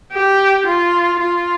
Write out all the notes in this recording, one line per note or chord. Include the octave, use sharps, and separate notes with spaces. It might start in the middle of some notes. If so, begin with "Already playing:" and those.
G4
F4
F4